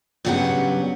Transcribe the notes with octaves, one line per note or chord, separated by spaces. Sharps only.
G2 C#3 F#3 B3 G4 F#5